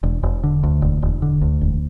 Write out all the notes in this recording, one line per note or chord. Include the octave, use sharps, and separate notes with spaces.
E1
E1
D3
D2
E1
E1
D3
D2
E1